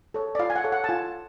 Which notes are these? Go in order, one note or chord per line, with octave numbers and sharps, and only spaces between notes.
A4 C#5
D5
F4 F5
G#5
F#5
A4 C#5
F#5
A5
F4 G#5